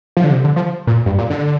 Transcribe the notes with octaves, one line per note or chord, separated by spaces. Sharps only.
F3
D3
C3
D3
F3
A#2
G2
A#2
D3